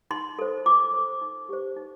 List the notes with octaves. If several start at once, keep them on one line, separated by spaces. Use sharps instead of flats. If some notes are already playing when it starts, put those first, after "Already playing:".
D#4 C6
A4 C5
F4 D6
A4 C5
D#4
G4 C5
D#4